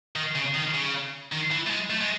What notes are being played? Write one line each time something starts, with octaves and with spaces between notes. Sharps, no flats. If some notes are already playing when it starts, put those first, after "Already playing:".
D#3
C#3
D#3
C#3
D#3
E3
A3
G#3
A3
G#3